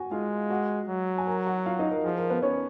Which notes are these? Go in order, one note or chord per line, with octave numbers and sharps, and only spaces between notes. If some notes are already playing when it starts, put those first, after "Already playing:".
Already playing: F#4 F#5 G#5
G#3 F4 F5
F#4 F#5
F#3
G#5
A#4 A#5
F#4 F#5
F4 F5
D#4 D#5
A#4
F3 G#4
A#4
B3 B4
C#4 C#5